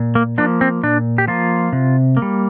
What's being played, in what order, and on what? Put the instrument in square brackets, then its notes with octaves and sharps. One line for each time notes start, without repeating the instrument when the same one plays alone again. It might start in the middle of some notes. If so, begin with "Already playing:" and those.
Already playing: [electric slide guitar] A#2
A#3
F3 A#3 D4
C4
A#2 D4
G4
F3 A#3 F4
C3
A#3
G3